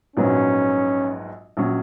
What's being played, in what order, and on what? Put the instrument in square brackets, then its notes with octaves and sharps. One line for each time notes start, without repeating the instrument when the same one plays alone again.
[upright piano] A#1 G#2 F#3 B3 [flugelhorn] C#4
[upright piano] A#1 F#3 C#4